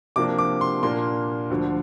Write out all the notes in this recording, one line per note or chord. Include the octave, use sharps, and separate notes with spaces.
C3 F3 A#3 D4 D6
D6
C6
A#2 A#3 D4 C6
D2 D3 F3